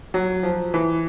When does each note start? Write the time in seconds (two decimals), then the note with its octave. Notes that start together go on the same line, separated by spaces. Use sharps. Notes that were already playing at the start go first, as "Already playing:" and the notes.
0.14 F#3
0.43 F3
0.74 E3